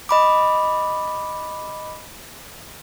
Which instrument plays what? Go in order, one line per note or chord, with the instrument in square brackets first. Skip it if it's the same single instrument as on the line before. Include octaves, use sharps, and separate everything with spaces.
[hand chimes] D#5 B5 D6